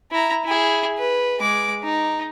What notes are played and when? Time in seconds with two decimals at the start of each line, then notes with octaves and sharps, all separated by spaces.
0.11 E4 A#5
0.45 E4 G#4
0.98 B4
1.40 G#3 D6
1.84 D#4